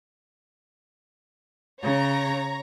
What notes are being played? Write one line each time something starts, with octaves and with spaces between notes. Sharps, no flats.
C#3 C#5 A#5